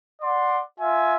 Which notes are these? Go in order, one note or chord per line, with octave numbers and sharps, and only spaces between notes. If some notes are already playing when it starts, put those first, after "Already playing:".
D5 F#5 C6
F4 E5 G#5